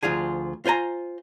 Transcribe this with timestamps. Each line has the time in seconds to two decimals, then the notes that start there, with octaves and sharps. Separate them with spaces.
0.03 D2 F3 F4 G#4 G#5
0.65 F4 C5 G#5 A#5